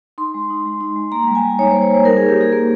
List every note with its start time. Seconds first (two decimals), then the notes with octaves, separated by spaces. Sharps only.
0.18 D#4 C6
0.34 G#3
0.50 D#4
0.65 G#3
0.81 D#4
0.96 G#3
1.12 A#3 A#5
1.27 G3
1.35 G#5
1.43 G3
1.59 D#4 C#5
1.71 C5
1.75 A#3
1.82 C#5
1.90 G3 C5
2.05 D#4 A#4
2.17 G#4
2.22 A#3
2.29 G4
2.37 D#4 G#4
2.52 A#3 A#4